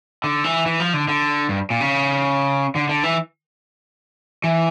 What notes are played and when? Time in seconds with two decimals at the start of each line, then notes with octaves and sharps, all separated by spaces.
0.24 D3
0.44 E3
0.66 E3
0.80 F3
0.94 D3
1.08 D3
1.49 G2
1.70 A#2
1.81 C#3
2.75 D3
2.89 D3
3.03 E3
4.44 E3